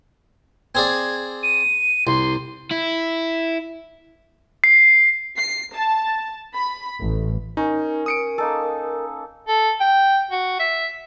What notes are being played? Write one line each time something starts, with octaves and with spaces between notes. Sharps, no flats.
C4 G#4 D5 G#6
D#7
C2 C6
E4
C7
C7
A5
B5
A1
C#4 D#4 A#4
D#6 C#7 D7
A#3 D#4 A4
A4
G5
F#4
E5